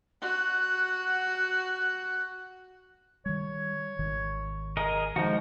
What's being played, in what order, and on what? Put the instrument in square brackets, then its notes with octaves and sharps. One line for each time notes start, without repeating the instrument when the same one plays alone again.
[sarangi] F#4 [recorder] F#6
[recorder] F#6
[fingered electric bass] D#3 G3 [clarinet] C#5
[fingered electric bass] G#1 D#3
[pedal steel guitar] G#4 A#4 D#5
[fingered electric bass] D#3 [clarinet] F3 [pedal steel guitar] G#3 D#4 F#4